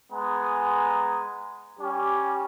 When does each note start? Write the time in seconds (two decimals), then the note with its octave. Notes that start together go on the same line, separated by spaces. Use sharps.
0.12 G#3 B3 G#5 A#5
1.80 G3 C#4 G4